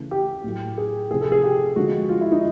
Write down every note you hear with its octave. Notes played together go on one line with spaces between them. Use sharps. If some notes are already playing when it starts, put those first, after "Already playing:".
Already playing: C#3 E3 A3
G4
A2 F#3 A3
G#4
C3 F3 A3 G#4
A4
G#4
G4
D3 F3 G#3 F#4
F4
E4
D#4